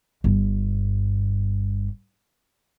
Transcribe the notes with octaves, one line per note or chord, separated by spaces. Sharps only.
G1 G2